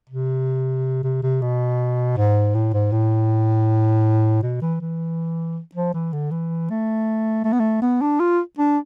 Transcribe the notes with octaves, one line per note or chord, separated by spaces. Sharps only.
C3
C3
C3
B2
G#2
A2
G#2
A2
B2
E3
E3
F3
E3
D3
E3
A3
A3
B3
A3
B3
D4
F4
D4